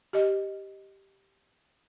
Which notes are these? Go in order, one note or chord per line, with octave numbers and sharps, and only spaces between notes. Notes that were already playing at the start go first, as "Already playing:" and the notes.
G4 D#5